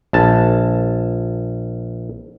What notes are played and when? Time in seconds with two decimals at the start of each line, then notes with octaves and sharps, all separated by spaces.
0.13 A#1 A5